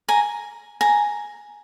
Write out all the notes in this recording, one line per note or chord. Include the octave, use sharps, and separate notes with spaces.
G#5 A#5
G#5 A#5